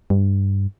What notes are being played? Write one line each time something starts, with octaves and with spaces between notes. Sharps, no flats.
G2